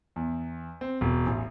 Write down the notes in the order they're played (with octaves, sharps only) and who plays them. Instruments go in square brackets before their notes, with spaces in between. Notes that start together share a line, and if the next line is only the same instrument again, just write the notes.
[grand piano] E2
C4
E1
A1